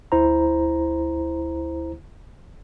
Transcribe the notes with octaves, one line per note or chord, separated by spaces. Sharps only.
D2 E4 C5 A#5